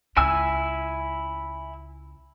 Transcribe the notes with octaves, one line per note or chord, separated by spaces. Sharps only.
C#2 C#4 E4 G#5 E6